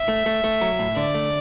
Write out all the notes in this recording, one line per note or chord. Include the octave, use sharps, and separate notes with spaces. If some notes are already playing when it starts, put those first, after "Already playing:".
Already playing: E5
A3
A3
A3
F#3
A2
D3 D5
A3